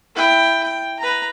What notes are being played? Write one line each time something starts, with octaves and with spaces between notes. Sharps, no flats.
E4 G5
G5
B4 A#5